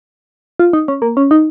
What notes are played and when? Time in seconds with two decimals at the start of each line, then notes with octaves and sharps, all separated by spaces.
0.59 F4
0.73 D#4
0.88 C#4
1.02 A#3
1.17 C#4
1.31 D#4